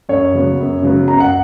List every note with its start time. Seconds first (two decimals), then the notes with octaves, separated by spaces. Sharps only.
0.09 F#2 C#5
0.34 C#3 F#3 B3
0.59 F#2
0.82 C#3 F#3 B3
1.08 F#2 A#5
1.20 F#5